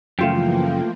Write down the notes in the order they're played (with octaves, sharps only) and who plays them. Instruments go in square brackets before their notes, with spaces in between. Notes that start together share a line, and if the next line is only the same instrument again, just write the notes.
[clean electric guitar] F#2 C#3 [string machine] E3 F3 A#3 [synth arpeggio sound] A3 F4 G5